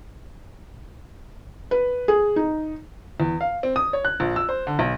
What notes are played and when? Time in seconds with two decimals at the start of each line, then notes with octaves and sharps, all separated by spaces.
1.71 B4
2.08 G#4
2.36 D#4
3.20 E2
3.41 F5
3.63 C4
3.76 D#6
3.93 C#5
4.05 F#6
4.20 A#1
4.36 E6
4.49 C5
4.67 D3
4.79 B1